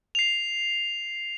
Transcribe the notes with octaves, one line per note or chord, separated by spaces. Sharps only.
C7 F7